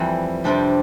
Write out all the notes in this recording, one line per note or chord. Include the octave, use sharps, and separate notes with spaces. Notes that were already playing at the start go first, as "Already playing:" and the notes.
Already playing: F2 E3 G3
F2 C3 G3 D4 G4